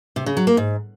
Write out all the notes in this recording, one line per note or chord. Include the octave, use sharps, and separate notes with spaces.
C3
C#3
F#3
A#3
G#2